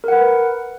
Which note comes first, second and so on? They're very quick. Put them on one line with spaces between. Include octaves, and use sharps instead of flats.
A#4 F#5 B4